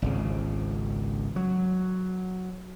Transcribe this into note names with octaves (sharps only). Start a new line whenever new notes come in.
G#1 C#2 C#3
F#3